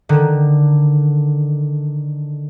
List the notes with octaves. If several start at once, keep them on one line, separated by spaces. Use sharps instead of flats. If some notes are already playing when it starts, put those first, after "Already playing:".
D3 D#3